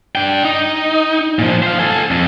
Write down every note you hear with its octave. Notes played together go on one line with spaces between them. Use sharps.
D4 G5
D#4
A#2 F3
C5 F5
A4 G#5
F2